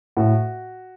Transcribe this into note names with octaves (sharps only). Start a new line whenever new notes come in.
A2 F#4